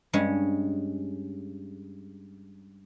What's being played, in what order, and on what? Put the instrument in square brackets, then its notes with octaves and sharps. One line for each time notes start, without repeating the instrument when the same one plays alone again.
[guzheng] G2 G#3 C#4